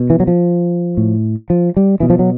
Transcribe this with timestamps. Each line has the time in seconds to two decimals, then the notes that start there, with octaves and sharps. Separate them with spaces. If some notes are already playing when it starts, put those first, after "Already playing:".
Already playing: B2
0.10 E3
0.20 F#3
0.27 F3
0.97 A2
1.50 F3
1.77 G3
2.00 B2 E3
2.10 F3
2.19 F#3